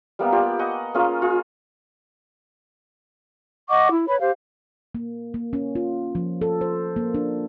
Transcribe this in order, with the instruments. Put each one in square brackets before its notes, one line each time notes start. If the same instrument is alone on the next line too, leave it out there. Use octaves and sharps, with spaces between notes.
[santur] G3 A#3 B3 E5
F4 G4 D5
D#5 F#5 G#5 C#6
A#3 C#4 F4 G#4
F4 G#4
[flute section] D#5 F#5 C#6 D6
E4
B4 C#5 B5
G4 C5 F5
[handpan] A#3
A#3
C#4
F4
F3
A4
C5
A#3
D4